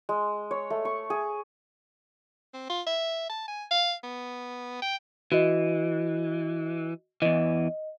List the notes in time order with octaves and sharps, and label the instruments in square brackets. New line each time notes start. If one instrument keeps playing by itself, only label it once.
[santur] G#3
C#5
A3
C#6
G#4
[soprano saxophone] C4
F4
E5
A5
G#5
F5
B3
G5
[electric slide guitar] E3 [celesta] F#4 D#5
[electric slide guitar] E2 E3 [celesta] D#5